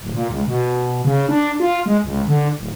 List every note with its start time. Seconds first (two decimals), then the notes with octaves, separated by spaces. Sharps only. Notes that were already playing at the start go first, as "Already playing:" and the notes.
0.01 D1
0.14 A#2
0.30 C#2
0.47 B2
1.05 C#3
1.29 D4
1.60 F4
1.86 G#3
2.04 C#2
2.28 D3
2.58 D1